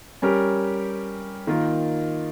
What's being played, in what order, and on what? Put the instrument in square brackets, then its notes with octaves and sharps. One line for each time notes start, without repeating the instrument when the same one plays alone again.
[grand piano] G3 C#4 G4 A#4
D#3 A#3 F4